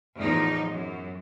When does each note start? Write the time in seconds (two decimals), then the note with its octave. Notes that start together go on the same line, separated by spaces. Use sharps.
0.17 E2 A2 F3 D#4
0.70 F#2